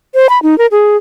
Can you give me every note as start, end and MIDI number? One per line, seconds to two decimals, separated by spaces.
0.15 0.27 72
0.29 0.39 83
0.43 0.57 63
0.58 0.66 70
0.72 0.97 68